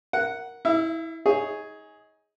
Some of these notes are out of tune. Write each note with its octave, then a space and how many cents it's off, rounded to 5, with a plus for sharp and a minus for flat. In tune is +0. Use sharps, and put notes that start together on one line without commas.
A#4 +0 F#5 +0
E4 -20 E5 +35
D#4 +30 G#4 +0 C#5 +0